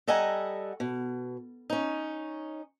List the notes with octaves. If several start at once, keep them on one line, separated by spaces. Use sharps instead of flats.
G3 A4 D#5 F#5 G#5 A#5
B2
C#4 D#4